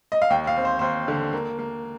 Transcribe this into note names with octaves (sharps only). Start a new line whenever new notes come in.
D#5
F5
D#2 G5
F5
C4
C5
D#2 C5
D3
A#3
A#3